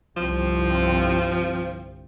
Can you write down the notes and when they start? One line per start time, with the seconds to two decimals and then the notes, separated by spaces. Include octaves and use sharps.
0.17 G1 C2 F3 C4